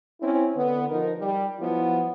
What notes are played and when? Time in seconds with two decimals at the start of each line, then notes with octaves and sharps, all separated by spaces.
0.21 C4 C#4 E4
0.55 D3 B3
0.89 F3 D#4 A#4
1.19 G3
1.59 F3 F#3 B3 E4